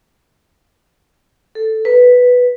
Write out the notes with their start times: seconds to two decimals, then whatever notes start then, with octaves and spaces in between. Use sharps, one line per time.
1.55 A4
1.85 B4